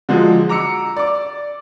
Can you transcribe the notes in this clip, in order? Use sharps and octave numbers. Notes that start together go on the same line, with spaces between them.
D3 F3 F#3 G#3
A#5 D6 E6 C#7
D5 D6